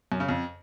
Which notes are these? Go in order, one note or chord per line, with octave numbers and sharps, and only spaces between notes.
F#2
C#3
F2